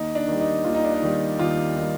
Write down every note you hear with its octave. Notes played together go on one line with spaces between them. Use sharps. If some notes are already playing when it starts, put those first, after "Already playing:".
Already playing: D#2 D#4
D4
D#3 G3
D#4
D#2 F4
D#4
D4
D#4
D#3 G3
D#2 F4
D#3 G3